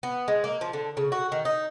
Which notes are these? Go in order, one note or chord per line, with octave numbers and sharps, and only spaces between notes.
B3
G#3
A#3
F3
D3
C#3
F#4
D#3
D#4